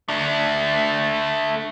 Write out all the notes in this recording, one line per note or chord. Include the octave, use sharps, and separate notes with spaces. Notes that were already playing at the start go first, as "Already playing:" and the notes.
A3 D4